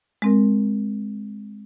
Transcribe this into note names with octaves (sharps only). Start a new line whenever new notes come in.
G#3 C4 A#4